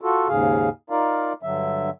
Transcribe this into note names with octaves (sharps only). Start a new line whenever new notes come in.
F4 F#4 A4
D#2 G#2 C#3 G#4 F5
D#4 F4 A#4 D5 F5
G2 D3 F#3 E5